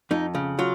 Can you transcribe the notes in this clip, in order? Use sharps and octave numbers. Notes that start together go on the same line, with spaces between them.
F2 D#4
C#3
F#3 F4